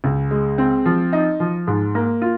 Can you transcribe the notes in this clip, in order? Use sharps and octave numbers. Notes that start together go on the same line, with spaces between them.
C#2
G#3
C4
F3
D#4
F3
G#2
A#3
F4